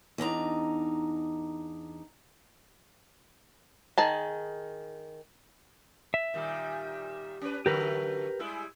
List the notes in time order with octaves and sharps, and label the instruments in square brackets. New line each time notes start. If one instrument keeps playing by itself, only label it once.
[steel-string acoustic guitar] E2 D4 D#4 A#5
[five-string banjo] D#3 G#4 A5
[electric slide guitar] E5
[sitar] A#2 D#3 G3
C#4 D4 B4
[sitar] D3 F#3 A3 [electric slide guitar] G4 A#4 B4
[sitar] G3 G#3 E4